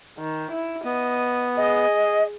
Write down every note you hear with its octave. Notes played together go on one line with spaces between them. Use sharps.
D#3
E4
B3 D#5
G#4 D#5